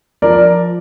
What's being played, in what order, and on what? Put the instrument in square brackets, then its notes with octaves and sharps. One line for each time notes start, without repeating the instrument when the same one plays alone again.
[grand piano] F3 A#4 D5